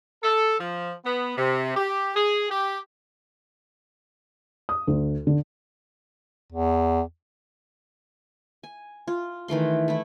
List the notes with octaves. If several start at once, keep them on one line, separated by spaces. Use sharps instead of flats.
A4
F3
B3
C3
G4
G#4
G4
D#6
D2
D3
E2
G#5
F4
D#3 E3 A3 C6
A3 E4